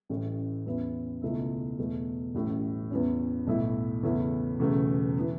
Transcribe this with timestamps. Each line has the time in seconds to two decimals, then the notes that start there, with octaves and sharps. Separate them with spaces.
0.09 A1 A2 A3 C#4
0.66 E2 E3 C#4 E4
1.22 C#2 B2 A3 E4
1.78 E2 B2 A3
2.34 A1 A2 F#3 A3 C#4
2.90 E2 E3 C#4
3.47 B1 A2 A3 E4
4.03 E2 C#3 A3 C#4 E4
4.59 E1 E2 C#3 A3
5.19 E3